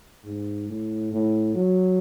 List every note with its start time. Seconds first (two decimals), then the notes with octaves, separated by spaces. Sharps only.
0.24 G#2
0.68 A2
1.12 A2
1.55 F#3